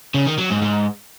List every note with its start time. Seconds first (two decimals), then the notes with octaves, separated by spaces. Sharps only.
0.14 C#3
0.26 D#3
0.38 F#3
0.50 G#2
0.62 G#2